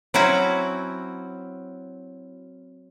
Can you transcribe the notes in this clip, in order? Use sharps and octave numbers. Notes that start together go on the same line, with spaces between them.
F#3 C4 C#4 E4 F#4